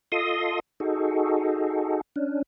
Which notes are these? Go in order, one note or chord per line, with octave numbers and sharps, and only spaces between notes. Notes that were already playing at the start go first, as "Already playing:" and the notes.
F4 A4 D#5 C6 D#6
D#4 F#4 G#4 A4
C#4 D4